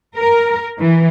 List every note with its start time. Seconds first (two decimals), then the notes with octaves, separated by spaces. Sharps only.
0.16 A#4
0.80 E3